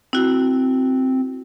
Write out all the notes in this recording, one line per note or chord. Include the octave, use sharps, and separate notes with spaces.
C4 E4 F#4